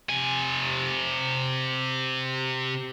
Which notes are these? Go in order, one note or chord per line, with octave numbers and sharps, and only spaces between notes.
C3 G#5